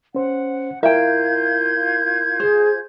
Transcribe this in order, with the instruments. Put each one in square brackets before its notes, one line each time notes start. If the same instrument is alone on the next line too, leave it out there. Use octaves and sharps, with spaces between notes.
[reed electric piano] C#4 C5 [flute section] F#5
[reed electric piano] E4 A#4 F5 [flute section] F4 G6 G#6 [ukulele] E5 G5
[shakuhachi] G#4 [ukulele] C5